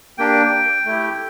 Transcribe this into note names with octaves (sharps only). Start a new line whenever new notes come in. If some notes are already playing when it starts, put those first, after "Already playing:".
A#3 D4 G4 G5
A3 E4 G4